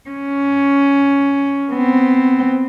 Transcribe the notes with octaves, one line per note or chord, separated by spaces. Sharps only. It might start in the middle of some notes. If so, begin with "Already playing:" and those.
C#4
B3 C4